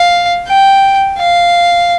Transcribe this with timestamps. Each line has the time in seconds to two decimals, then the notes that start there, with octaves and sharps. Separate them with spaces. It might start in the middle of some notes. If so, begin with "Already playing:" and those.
Already playing: F5
0.48 G5
1.18 F5